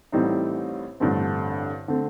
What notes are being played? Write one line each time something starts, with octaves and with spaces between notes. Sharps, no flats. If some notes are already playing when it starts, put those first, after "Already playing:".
A1 A2 G3 C4 D#4
A1 G2 D3 A3 C4
D3 A3 C4